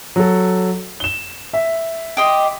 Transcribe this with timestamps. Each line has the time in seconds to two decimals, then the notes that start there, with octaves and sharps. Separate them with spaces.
0.16 F#3 A4
1.00 E7 G7
1.53 E5
2.17 G4 D#5 C6